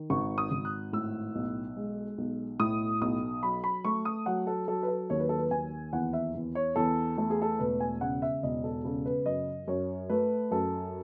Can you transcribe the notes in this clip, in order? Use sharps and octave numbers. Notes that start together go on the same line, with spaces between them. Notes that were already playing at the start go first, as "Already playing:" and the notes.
Already playing: D#3
G#1 C#6
D#6
G#1
F#6
A2 E6
B1
G#3
B1
A2 D#6
B1 D#6
F#3 B5
B5
A3 C#6
D#6
F#3 F#5
A4
F#3 A4
B4
A4
D#2 C#5
B4
A4
B4
D#2 G#5
E2 F#5
E5
E2
C#5
E2 A4
A3 A4
G#4
A4
E1 B4
G#5
C#3 F#5
E5
E1 D#5
A4
C#3 A4
B4
F#2 D#5
F#2 C#5
A3 B4
F#2 A4